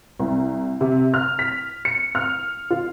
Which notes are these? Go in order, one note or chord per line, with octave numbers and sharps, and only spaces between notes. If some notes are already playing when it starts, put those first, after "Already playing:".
C2
C3
F6
B6
C#7
F6
F4